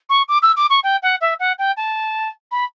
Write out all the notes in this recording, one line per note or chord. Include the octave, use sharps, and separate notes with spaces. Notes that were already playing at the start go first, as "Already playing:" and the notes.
C#6
D6
E6
D6
C#6
G5
F#5
E5
F#5
G5
A5
B5